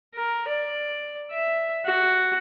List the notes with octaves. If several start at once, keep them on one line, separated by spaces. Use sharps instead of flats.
A#4
D5
E5
F#4